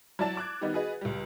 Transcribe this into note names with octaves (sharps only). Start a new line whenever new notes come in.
F#3 E4 D5 A5 A6 E7
D6 F#6 G#6
D#3 G3 B3 D#4
F#4 G#4 B4 D#5
C#2 G3